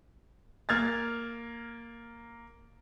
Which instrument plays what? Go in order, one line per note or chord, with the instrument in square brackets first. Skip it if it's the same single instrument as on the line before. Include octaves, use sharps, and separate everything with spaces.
[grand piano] A#3 F6 G#6 A6